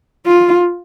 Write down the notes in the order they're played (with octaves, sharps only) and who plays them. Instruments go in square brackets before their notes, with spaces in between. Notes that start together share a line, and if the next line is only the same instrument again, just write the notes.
[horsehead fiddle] F4